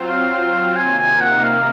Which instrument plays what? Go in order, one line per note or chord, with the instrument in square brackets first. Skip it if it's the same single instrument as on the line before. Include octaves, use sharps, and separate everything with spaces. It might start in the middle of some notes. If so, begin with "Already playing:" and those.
Already playing: [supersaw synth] F#3 C4 F4 C5
[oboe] F5
[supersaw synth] C3 D#3 A#3 [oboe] G#5
[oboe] G#5
F#5
F5